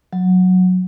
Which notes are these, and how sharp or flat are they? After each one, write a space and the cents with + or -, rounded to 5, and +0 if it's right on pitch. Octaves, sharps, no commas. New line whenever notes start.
F#3 -10